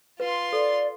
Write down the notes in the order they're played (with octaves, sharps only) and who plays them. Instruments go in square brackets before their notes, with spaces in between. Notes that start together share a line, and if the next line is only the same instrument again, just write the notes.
[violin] F4 C6 [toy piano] B4
[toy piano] A4 [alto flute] D5